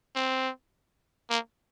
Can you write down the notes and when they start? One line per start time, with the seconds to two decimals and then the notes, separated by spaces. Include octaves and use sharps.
0.16 C4
1.30 A#3